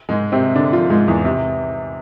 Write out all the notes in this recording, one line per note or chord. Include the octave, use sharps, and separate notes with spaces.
G#2 G#3
C3 C4
D3 D4
F3 F4
G#2 G#3
E2 E3
C3